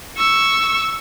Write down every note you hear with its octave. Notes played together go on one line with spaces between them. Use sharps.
C#6 E6